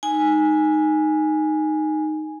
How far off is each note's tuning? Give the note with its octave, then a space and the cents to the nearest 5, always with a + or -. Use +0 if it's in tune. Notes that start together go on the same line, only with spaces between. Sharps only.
D#4 -5 G#5 +0